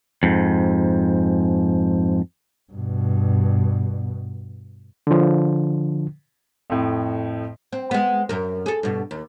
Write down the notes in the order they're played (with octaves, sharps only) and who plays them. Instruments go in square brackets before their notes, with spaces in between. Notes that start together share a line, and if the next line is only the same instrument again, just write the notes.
[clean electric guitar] F2 G#2
[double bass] G2 B2
[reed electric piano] D3 F3
[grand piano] F2 A2
[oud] C4
G#3 B3
F#2 A#4
G#4 A4
G2 B2
D#2